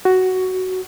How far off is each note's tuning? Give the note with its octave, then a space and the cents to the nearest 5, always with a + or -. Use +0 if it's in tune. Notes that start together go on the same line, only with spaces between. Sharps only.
F#4 +10